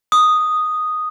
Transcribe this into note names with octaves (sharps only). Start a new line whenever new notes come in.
D#6